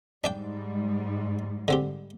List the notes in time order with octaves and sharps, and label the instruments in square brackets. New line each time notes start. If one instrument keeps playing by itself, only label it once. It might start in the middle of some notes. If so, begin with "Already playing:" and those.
[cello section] G#2 G3 [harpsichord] D4 D5 G5
[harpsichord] D3 C4 G4